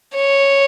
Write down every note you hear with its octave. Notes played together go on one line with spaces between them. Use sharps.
C#5